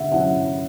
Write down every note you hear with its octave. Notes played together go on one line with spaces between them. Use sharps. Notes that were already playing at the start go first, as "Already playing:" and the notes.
Already playing: D3 E5 F#5
F#3 C#4 E4 F#5